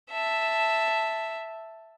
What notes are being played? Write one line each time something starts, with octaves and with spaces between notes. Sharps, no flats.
E5 A5